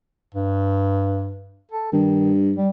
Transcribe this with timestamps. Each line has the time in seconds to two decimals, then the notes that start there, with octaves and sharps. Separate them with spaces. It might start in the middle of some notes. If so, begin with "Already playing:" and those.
0.35 G2
1.72 A4
1.93 G2 D#3
2.56 G3